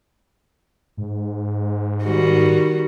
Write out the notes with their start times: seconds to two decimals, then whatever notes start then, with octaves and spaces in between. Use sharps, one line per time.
0.97 G#2
2.04 D#3 G3 F#4